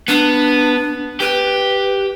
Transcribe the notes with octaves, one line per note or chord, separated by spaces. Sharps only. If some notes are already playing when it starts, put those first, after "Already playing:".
B3 D4
G4 B4